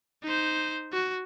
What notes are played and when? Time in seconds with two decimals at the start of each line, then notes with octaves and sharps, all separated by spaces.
0.23 D#4 C5
0.93 F#4